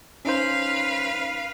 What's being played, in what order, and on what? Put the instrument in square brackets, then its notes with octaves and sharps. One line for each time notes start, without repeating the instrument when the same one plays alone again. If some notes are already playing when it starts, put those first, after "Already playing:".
[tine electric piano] C#4 D#4 C5 [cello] B4 F5